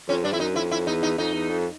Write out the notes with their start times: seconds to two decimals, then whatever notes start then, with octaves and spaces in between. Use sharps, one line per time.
0.09 F2 C#4
0.24 G2 D4
0.33 F2 E4
0.40 F#2 D#4
0.56 F2 E4
0.71 E4
0.87 E2 D#4
1.03 D#4
1.18 F2 D#4
1.34 E2
1.49 F2